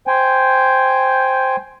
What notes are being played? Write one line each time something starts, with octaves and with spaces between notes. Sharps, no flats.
C5 G5 G#5